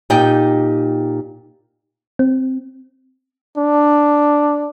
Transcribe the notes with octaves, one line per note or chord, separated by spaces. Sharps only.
A#2 D#4 G4 G5
C4
D4